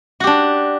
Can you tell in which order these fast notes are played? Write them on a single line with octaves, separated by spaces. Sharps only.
F#4 G4 D4